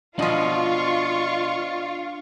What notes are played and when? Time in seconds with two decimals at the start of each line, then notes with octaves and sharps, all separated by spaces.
0.19 B2 F3 D4 F4 D#5 F5 C#6